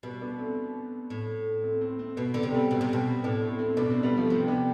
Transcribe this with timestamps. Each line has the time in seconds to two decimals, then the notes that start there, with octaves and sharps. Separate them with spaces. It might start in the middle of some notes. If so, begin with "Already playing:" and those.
0.03 B2 G3 B3
0.21 B3 D4
0.39 A3 C4
1.10 A2
1.63 A3 C4
1.81 A3 C4
1.98 A3 C4
2.17 B2 B3
2.26 C4
2.34 D3 B3
2.43 C3 C4
2.54 G3 B3
2.70 B2 A3 C4
2.81 C3
2.93 B2
3.24 A2 B3 D4
3.42 A3 C4
3.59 A3 C4
3.77 B2 B3 D4
3.90 A3 C4
4.03 G3 B3
4.17 F3 A3
4.30 C3 A3 C4
4.48 B3 D4